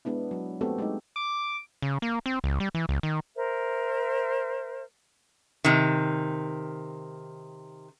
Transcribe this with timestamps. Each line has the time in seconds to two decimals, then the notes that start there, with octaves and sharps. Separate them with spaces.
0.05 G#3 B3 D4 E4
0.31 F#3
0.61 A3 B3 C4 F#4 G4 A4
0.78 G#3 A3 D#4
1.16 D6
1.82 C#3
2.02 A#3
2.26 C4
2.44 C#2
2.60 G3
2.75 E3
2.89 C#2
3.03 D#3
3.35 A#4 C5 E5
5.64 C3 D#3